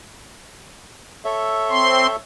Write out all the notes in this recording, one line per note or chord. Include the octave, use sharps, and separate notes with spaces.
A4 C#5 E5
C4 C6